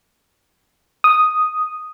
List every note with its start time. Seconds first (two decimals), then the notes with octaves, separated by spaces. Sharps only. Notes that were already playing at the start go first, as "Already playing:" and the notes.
1.04 D#6